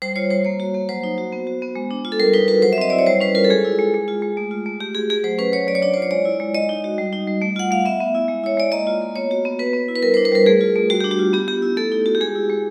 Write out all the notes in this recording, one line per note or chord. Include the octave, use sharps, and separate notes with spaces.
G3 C5
F4 C#5
G3 C5
A#3 C#5
F#4
A#3
F#3 C5
D#4
F#4
B3
F#4
B3
G#3
D4
F4
A4
G3 A#4
D#4 B4
F#4 B4
F#3 C5
E5
C4 D#5
E4 D5
C#5
G3 C5
C#4 B4
F4 A#4
A4
G#3 G#4
E4
G#3
G#3
F4
G#3
A3
F4
A3
A3 G4
F#4 G#4
A3 G#4
F#3 C5
C#4 B4
F#3 C#5
F#3 D5
C#5
D4 D5
F4 C5
C#5
G#3 D5
E4
G#3
G#3 D#5
D#4
F#4
G3
D#4
G3
A3
F4 F#5
A3 F5
B3 E5
B3
E4
G#3
E4 C#5
G#3 D5
A#3 D#5
F4
A#3
B3 C#5
F#4
B3
B3 B4
B3
E4
B4
G3 A#4
C5
D4
B4
G3 A#4
A3 G#4
F4
A3
G3 F#4
D4 G4
F#4
F4
B3 G4
B3 G4
E4
A3 A4
D#4
F#4
G4
G#3 G#4
E4
G#3